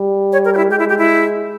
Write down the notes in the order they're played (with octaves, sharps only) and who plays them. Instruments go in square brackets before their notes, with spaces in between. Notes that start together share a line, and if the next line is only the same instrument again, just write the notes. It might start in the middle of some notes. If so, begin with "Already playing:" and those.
Already playing: [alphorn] G3
[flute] C#5
A#4
G4
E4
[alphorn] G#3 [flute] G4
[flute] E4
G4
E4